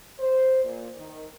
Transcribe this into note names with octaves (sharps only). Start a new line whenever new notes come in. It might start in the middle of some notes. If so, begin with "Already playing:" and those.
C5
A#2
D#3